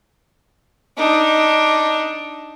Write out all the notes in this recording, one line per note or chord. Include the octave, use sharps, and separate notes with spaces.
D4 D#4